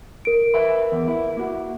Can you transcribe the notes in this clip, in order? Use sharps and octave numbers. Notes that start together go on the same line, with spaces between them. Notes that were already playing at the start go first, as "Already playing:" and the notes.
A#4 D7
B4 E5 B5
E2
E4
A#3 F#4